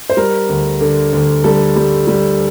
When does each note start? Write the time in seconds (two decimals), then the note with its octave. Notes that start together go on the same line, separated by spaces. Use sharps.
0.10 C5
0.17 G3 A#4
0.49 D2
0.81 D3
1.13 D2
1.44 G3 A4
1.76 G3
2.08 G3